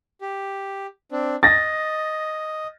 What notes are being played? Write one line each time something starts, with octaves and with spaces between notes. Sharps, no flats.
G4
C4 D4
D#5 A6 A#6